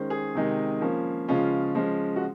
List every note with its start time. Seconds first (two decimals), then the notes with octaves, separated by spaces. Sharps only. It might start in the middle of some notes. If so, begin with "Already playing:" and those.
Already playing: D#3 G#3 C#4 C5
0.10 G#4
0.35 C3 D#3 G#3
0.81 F3 A#3 C#4
1.28 C#3 F3 G#3 C#4 F4
1.75 F3 G#3 C#4
2.16 F#4